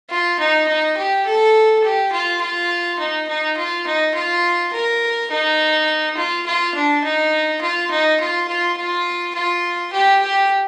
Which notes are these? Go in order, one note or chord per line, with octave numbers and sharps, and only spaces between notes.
F4
D#4
D#4
G4
A4
G4
F4
F4
D#4
D#4
F4
D#4
F4
A#4
D#4
F4
F4
D4
D#4
F4
D#4
F4
F4
F4
F4
G4
G4